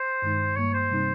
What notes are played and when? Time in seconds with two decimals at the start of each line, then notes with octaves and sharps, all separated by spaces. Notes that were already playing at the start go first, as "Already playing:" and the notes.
Already playing: C5
0.22 G2 D#3 G#3 D#4
0.56 G2 G3 A#3 C#5
0.74 C5
0.90 C3 G3 C4 D#4